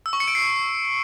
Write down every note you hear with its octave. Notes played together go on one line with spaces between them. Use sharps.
E6
C#6
C#7
D7
C7